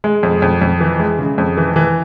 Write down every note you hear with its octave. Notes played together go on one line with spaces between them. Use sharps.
G#3
F2
F2
F2
E3
G#3
C#3
F2
E3
E3